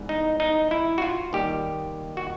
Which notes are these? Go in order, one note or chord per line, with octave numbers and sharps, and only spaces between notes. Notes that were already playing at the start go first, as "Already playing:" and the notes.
Already playing: G#2 E3 G3 B3
D#4
D#4
E4
F#4
F4
D#2 D#3 G3 G4
F#4